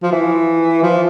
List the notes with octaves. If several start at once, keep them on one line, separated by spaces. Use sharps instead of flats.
F3
E3
F3